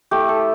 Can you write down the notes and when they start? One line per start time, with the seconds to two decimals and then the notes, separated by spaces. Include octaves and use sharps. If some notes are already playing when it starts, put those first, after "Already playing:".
0.11 A3 E4 G4
0.29 A4